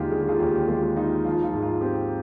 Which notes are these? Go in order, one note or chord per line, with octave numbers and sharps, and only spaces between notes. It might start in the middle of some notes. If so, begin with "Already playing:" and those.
Already playing: D#2 D3 G#3 D#4 F4 G4 G#4
D3 G#4
G4
F4 G#4
D#2 G4
G#3 F4
D#4 F4
F3 F4
F4
G#2
F4
C4 G4